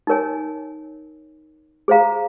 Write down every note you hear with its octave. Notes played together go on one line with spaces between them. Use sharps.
D#4 A#4 C#5 G#5
G#4 C5 F5 A#5